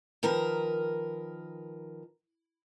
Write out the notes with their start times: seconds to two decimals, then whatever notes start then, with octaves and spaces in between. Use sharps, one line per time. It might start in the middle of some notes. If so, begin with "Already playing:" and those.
0.23 D#3 F3 A#4 B4 A#5